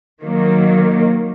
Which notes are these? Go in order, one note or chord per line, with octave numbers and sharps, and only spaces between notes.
D#3 F#3 A#3